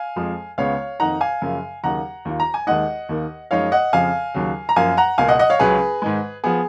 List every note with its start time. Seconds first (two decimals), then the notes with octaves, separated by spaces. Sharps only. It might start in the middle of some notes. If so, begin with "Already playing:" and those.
Already playing: F5 G#5
0.16 F2 F3 G#3
0.58 C#2 C#3 G#3 B3 C#5 F5
1.00 F2 D#3 A#3 D#4 F#5 A#5
1.21 F5 G#5
1.41 F#2 C#3 F3 A#3
1.84 D#2 C#3 F#3 A#3 D#4 F#5 A#5
2.25 D#2 D#3 A#3 F4
2.40 A#5
2.54 G#5
2.67 D#2 D#3 G#3 D#4 D#5 F#5
3.09 D#2 D#3 A#3
3.51 F#2 F3 G#3 D#4 C#5 F5
3.72 D#5 F#5
3.93 F2 C#3 F3 F5 G#5
4.34 D#2 C#3 F#3
4.69 A#5
4.76 F#2 F3 A#3 F5 G#5
4.97 F#5 A#5
5.18 C#2 B2 A#3 F5 G#5
5.28 D#5 F#5
5.39 D#5 F#5
5.50 C#5 F5
5.60 C#2 C#3 F#3 C#4 G#4 B4
6.02 G#2 D#3 G#3
6.44 F3 B3 G#4